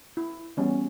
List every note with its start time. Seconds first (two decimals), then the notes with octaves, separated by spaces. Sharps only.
0.17 E4
0.57 E3 G3 B3 C#4